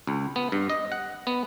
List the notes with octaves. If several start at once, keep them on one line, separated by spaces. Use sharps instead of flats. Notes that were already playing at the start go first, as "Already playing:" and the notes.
C#2
B3
G2
D#5
F#5
B3